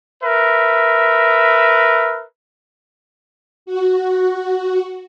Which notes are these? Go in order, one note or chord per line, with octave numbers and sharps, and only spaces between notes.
A#4 B4 E5
F#4